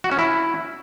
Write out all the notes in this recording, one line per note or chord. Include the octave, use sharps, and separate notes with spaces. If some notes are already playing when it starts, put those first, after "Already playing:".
F#4
C#4
E4